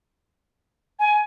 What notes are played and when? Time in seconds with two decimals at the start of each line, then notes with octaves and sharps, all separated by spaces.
0.99 G#5